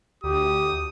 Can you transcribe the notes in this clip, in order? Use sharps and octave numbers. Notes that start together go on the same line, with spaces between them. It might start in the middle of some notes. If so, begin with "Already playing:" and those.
D2 G4 D#6